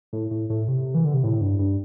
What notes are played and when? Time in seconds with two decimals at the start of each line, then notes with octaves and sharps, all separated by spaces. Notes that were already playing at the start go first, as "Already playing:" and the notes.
0.13 A2
0.31 A2
0.50 A2
0.68 C3
0.95 E3
1.04 D3
1.14 C3
1.24 A2
1.41 G2
1.59 G2